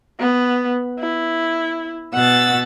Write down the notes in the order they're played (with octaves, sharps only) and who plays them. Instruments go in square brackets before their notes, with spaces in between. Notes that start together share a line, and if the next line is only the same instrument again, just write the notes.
[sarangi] B3
E4
[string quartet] B2 E6 A6 [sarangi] F#5